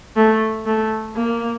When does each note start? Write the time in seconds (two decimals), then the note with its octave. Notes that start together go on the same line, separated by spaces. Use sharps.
0.16 A3
0.66 A3
1.15 A#3